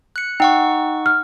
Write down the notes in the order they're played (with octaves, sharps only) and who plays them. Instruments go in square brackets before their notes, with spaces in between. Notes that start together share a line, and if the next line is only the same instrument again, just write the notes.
[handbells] F#6 C#7
[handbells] D#4 F#5 C#6 [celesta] G5
[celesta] F6